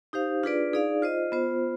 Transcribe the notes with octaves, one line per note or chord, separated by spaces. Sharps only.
D#4 G4 C5 F5
D4 F4 G#4 B4 D5
D#4 G#4 D5 F5
F4 C5 D#5
B3 F4 C5